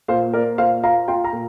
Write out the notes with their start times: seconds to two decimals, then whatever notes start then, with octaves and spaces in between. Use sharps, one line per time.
0.08 A#2 C5 F5
0.33 A#3 A#4 D5
0.58 A#2 C5 F5
0.83 F4 F5 A#5
1.08 F4 G5 C6
1.24 F5 A#5
1.33 A#2